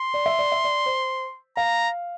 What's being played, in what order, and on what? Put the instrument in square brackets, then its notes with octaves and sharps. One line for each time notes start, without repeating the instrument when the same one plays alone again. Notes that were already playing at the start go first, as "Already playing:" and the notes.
Already playing: [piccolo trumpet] C6
[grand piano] D5
E5
D5
E5
D5
C5
[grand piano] F5 [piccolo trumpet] A#5